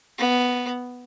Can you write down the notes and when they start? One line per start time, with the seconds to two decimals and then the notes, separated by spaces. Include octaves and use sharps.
0.18 B3